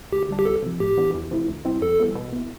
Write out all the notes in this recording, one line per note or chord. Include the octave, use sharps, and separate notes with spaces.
D2 G4
D3 G3 D4
G4
C2 A4
C3 F3
A2 G4
E3 B3 D4
E2
C3 F3 A3 E4
D2
C3 G3 C4 E4
F2 A4
E3 G3 B3 E4
B2
B3 E4